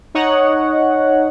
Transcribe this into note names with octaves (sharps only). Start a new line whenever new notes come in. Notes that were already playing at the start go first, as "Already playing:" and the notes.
D#4 C#5 D#5 F#5